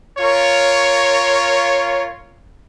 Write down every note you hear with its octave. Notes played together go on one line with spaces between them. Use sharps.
F4 A#4 C#5